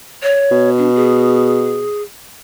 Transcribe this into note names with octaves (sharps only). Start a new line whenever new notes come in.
C#5
B2
D4
G#4